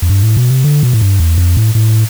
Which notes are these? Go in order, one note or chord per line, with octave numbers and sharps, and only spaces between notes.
F2
G2
A2
B2
C3
D3
B2
A2
G2
E2
F2
A2
A2